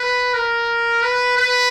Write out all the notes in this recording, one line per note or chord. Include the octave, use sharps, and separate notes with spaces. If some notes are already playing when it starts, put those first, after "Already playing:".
Already playing: B4
A#4
B4
B4